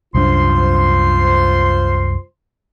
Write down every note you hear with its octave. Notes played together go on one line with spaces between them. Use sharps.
C2 F#2 D4 F4 C5 C6